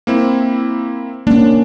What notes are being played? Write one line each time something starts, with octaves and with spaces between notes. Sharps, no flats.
A#3 C4 E4
A#3 C#4 D4